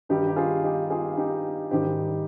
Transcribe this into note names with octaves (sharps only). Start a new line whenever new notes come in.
G2 D#3 G3 D#4 G4
G4
F4 G#4
D#4 G4
F4 G#4
D#4 G4
G#2 D#3 G3 D#4 G4